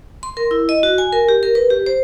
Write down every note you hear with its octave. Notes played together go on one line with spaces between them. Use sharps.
C6
A#4
E4
D#5
F#4
G#5
A#4
G4
A#4
B4
G4
C5